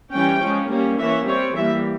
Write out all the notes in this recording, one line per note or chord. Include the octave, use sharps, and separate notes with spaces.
E3 G3 C#4 G5
F3 G#3 C#4
G3 A#3 C#4
E3 A#3 C#4 E5
G3 C4 C#5
E3 G3 A#3 E5